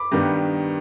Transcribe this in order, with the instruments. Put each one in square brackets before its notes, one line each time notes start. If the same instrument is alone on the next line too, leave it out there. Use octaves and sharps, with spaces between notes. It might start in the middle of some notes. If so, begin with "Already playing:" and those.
Already playing: [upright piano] B5 D6
G2 D#3 G3 B3